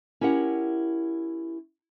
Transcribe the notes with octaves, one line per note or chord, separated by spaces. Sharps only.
C#4 E4 G4 A#4 F#5